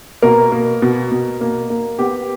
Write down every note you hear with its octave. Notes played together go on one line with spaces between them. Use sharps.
B2 A#3 A#4
A#3
B2
B2
A#3
A#3
B3 G4